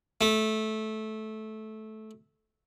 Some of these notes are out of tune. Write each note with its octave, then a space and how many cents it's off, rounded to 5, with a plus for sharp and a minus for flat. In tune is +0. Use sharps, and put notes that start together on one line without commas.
A3 -15